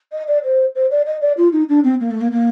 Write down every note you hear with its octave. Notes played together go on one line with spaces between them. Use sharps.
D#5
D5
C5
C5
D5
D#5
D5
F4
D#4
D4
C4
A#3
A3
A#3
A#3